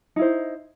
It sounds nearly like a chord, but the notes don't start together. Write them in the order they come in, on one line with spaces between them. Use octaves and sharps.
D#4 E4 C5